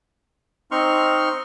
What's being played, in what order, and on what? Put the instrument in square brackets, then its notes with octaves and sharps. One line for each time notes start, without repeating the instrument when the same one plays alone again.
[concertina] C4 D#4 C6 C#6 F6